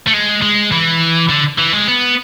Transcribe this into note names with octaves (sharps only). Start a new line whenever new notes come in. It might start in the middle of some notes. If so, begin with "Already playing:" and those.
A3
G#3
G#3
E3
D3
E3
G#3
B3